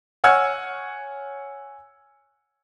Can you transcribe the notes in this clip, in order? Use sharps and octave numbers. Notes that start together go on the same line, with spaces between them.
C#5 F#5 G#5 E6 F6 G#6